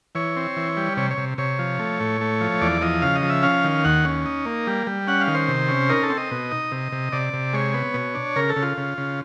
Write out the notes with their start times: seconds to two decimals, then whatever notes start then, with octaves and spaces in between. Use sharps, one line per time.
0.15 E3 C#5
0.36 C4
0.57 E3
0.77 G3
0.97 C3 C#5
1.11 C#5
1.18 C3
1.38 C3 C#5
1.59 F3
1.79 A3
2.00 A2
2.21 A3
2.41 F3
2.61 E2 D5
2.82 F3 D#5
3.02 C#3 F5
3.15 D#5
3.22 F3
3.30 E5
3.43 C#4 F5
3.64 D#3
3.84 D#2 F#5
4.05 C#4
4.26 D#4
4.46 A#3
4.67 G3
4.87 G3
5.07 C#4 F#5
5.21 F5
5.27 D#3
5.35 C5
5.48 C3
5.68 C#4
5.89 D#4 A#4
6.03 A4
6.10 C4
6.17 D#5
6.31 B2
6.51 D#4
6.71 C3
6.92 C3
7.12 C3 D5
7.33 C3
7.53 G#3 C#5
7.74 B3
7.94 B2
8.15 D4
8.36 C#3 A#4
8.49 A4
8.56 C#3
8.62 F4
8.77 C#3
8.98 C#3